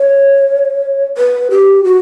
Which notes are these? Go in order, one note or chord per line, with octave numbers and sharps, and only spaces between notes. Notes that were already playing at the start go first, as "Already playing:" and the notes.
Already playing: C#5
B4
G4
F#4